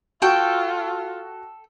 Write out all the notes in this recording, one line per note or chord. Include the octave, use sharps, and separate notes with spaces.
F4 F#4 A4 G5 C#6